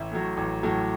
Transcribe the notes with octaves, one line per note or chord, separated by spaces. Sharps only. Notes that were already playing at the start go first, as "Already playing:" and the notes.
Already playing: A1 E5
A2 F#3
A1
A2 F#3